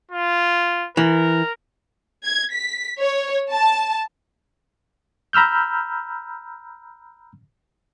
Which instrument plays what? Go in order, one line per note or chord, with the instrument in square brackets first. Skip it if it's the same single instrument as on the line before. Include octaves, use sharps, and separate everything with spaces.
[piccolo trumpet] F4
[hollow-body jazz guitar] E3 [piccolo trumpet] A#4
[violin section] G#6
B6
C#5
A5
[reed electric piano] A#5 B5 E6 F6 G6